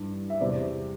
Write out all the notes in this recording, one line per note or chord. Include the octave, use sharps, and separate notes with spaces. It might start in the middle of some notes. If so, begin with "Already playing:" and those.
Already playing: G2 E3
E5
E2 C3 E3 D5